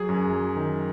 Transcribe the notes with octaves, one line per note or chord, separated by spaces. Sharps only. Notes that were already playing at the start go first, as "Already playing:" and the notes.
Already playing: F#3 G#4
F#2
F#3
D#3